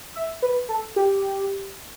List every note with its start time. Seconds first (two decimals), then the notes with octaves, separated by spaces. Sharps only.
0.15 E5
0.42 B4
0.69 A4
0.96 G4